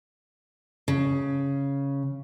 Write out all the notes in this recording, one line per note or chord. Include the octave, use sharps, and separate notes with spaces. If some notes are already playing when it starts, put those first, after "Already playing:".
C#3